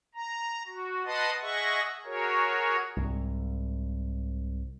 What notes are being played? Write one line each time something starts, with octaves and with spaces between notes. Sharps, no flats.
A#5
F#4
B4 D#5 F#5 A5 C6 D#6
G#4 D#5 E5 F#5 C#6
F#4 G#4 A#4 C#5
C2 G#2